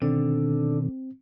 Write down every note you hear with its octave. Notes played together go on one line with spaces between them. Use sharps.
B2 D3 D#3 C4